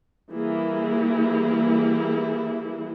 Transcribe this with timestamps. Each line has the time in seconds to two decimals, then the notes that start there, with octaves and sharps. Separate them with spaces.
0.31 E3 G3 A#3 E4 G#4